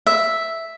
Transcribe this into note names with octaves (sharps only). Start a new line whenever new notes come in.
E5